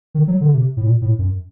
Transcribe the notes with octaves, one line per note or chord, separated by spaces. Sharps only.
D#3
F#3
D3
C3
A2
A#2
A2
F#2